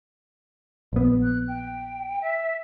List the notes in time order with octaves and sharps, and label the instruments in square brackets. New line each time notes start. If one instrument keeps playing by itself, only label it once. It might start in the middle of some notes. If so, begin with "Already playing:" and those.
[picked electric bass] A#1 B3
[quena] F#6
G5
E5